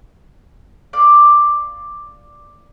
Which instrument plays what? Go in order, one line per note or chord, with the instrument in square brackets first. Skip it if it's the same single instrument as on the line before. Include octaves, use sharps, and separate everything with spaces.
[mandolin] D5 F5